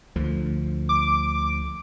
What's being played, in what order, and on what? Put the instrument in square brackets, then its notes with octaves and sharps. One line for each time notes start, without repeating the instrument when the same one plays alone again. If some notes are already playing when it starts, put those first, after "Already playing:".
[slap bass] D2 D3 F3
[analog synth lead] D6